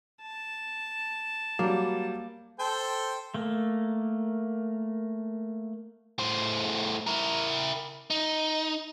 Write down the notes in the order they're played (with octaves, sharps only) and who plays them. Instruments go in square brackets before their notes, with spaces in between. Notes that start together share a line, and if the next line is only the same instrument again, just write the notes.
[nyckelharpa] A5
[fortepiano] F#3 G3 [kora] A#3
[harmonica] A4 C5 G5
[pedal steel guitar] A3 A#3
[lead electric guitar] A2 C5
E4 A#4
D#4